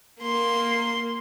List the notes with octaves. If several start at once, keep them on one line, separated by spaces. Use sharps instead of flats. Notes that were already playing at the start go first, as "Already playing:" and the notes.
A#3 C6